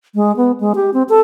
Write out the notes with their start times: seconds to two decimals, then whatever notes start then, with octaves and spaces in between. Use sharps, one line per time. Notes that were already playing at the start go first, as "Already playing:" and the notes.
0.15 G#3
0.37 B3
0.60 G#3
0.75 G4
0.94 C4
1.09 A4